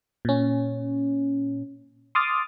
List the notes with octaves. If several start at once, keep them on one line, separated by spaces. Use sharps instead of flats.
A#2 C#4
C6 D6 D#6 F6 A6